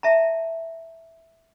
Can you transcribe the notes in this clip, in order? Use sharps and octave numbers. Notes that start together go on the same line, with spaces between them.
E5 A5 A#5